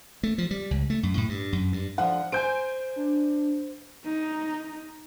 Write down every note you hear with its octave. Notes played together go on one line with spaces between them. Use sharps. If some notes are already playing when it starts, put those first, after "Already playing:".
A3
F3
G3
C#2
A3
F#2
A2
G2
F#2
G2
D3 F3 F#5
C5 G#5 G6 D7
D4
D#4